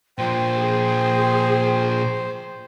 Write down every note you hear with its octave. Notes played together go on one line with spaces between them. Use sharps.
A#2 F3 C5 G5
G#4